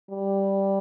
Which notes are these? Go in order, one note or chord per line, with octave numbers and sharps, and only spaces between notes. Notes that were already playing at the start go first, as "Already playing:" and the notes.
G3